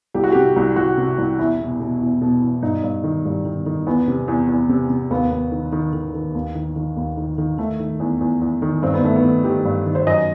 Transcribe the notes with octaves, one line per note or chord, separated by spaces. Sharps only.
C2 G4
F#4
C3 G4
C2
C2 F#4
C3
C2
E2 E4
B2
B2
E2
B2
E2
G2 D#4
G2
D#3
G2 G3
D#3
D#3
E2 B3
C3
E2
E2
C3
C3
D#2 B3
D#2
D#3
D#3
D#3
D#3
D#2
D#3
D#3
D#2
D#3
D#3
D#3 A3
D#3
E2
E2
E2
D#3
G2 C4
B3
D#3 A3
B3
D#3
D#3 G4
G2
D#3
C5
F#2 D#5